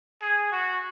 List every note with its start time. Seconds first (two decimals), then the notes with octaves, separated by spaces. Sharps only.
0.22 G#4
0.52 F#4